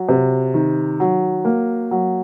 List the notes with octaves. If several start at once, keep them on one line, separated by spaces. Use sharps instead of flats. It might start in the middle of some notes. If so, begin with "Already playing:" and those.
Already playing: F#3
C3
D#3
F#3
A#3
F#3